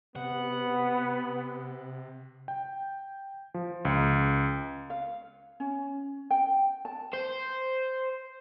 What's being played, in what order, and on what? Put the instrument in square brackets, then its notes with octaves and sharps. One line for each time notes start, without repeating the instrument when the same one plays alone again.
[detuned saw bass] C3 [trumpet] B3 [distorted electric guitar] F#5
[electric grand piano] G5
F3
C#2
[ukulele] F5
C#4
G5
A5
[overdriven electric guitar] C5